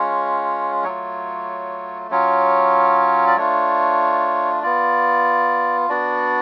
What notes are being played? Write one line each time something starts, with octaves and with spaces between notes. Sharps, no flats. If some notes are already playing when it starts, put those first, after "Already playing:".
Already playing: G#3 C#4 F4 C#5
F#3 A3 F4 C#5
F#3 C#4 F4 C#5
D5
A3 D4 F4 C#5
B3 F4 D5
B3 D4 F#4 D5